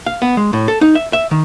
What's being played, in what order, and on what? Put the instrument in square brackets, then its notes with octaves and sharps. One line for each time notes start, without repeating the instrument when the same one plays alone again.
[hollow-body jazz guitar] F5
B3
G#3
A2
A4
D#4
E5
E5
D#3